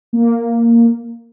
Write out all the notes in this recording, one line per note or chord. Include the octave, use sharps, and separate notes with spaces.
A#3